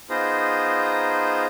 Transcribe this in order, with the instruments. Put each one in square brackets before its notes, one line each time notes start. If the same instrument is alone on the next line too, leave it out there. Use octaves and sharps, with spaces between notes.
[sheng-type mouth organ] B3 D#4 F4 G#4 C5 A#5